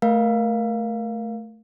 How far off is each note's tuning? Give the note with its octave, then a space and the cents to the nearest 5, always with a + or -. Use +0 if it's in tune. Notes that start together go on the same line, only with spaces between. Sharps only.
A3 +0 A#4 +20 F5 +0